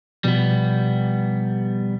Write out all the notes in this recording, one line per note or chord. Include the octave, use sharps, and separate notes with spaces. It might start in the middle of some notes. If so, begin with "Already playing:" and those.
B2 F3 G3 B3